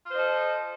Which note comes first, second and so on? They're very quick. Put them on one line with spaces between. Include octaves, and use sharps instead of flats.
F4 C5 D#5 A4